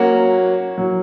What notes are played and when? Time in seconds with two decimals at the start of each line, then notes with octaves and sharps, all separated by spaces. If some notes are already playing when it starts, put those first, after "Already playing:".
Already playing: F#3 A#3 C#4 F#4
0.78 F#3